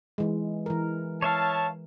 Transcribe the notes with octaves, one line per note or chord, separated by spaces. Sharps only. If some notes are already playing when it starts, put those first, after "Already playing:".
E3 G#3
E3 A#4
C#5 E5 F5 A5